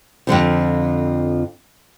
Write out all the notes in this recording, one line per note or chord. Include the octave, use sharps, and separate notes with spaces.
F2 A#2 D3 F3